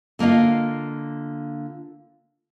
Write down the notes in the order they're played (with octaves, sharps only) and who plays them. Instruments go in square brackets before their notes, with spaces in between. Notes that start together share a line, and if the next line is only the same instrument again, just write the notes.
[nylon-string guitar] D3 A#3 F4 D#5 F5